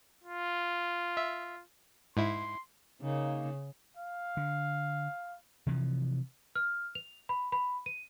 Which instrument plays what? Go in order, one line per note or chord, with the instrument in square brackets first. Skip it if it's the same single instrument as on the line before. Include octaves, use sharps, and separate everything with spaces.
[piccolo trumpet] F4
[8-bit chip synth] E5
[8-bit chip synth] G#2 E4 [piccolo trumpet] C6
[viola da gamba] C#3 [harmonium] A#3 D#4
[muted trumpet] F5
[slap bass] D3
C3 E3 F3
[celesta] F6
F7
B5
B5
D#7